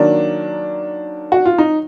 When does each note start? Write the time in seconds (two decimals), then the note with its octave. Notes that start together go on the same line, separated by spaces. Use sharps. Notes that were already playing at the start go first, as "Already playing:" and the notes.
Already playing: D#3 F#3 A#3 D4
1.32 F#4
1.46 F4
1.58 D#4